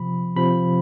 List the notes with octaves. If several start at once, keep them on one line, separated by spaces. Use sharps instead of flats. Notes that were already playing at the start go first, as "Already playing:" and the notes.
Already playing: C3 F3 B5
C3 F3 B5